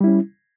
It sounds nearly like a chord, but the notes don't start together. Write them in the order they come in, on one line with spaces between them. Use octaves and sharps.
G3 E4 C#4